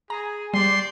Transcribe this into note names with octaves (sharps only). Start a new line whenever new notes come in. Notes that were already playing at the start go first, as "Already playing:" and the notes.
G#4 A#5
G3 C5 D5 C6